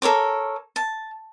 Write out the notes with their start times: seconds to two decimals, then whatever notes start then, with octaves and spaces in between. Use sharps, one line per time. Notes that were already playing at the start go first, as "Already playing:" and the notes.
0.02 A4 A#4 C#5 D6
0.76 A5